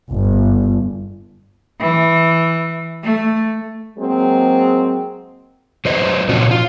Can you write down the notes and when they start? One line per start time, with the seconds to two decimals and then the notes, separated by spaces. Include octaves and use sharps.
0.11 G1
1.80 E3
3.03 A3
3.97 F#3 G#3 A#3 C4
5.85 F#3 B4 C5 D#5
6.29 A#2 C#3 F3 C#4 D4 F#4
6.51 F4